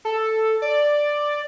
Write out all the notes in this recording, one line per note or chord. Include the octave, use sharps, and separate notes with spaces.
A4
D5